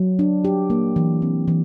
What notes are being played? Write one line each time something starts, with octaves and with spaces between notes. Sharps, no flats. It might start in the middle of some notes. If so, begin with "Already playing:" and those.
Already playing: F#3
D4
G4
A#3
E3
C4
E3